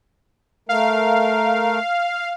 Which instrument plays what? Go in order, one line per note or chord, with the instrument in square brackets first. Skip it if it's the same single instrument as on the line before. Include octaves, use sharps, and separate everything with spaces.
[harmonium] A3 A#4 [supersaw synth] F5